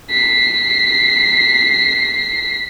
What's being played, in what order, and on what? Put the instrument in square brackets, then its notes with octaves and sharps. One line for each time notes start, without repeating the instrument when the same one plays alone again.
[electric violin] B6 C7